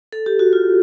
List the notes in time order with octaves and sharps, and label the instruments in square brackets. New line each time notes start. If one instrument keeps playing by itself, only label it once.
[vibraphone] A4
G4
F#4
F4